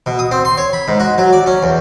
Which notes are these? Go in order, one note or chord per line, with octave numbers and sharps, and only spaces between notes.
B2
D#6
C4
C6
C#5
B5
G#2
F#4
F#3
D5
C#4
E2